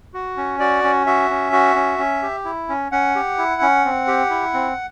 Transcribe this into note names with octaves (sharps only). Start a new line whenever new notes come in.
F#4
C#4
F#4 D5
C#4
F#4 E5
C#4
F#4
C#4
C#4
G4
E4
C#4
C#4 F#5
G4
E4
C#4
C4
G4
E4
C4